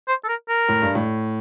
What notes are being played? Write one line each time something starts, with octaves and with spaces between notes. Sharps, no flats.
C5
A4
A#4
A#4
A2
G2
A2